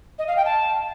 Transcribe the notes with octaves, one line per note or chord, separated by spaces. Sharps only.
D#5
F5
G5
A5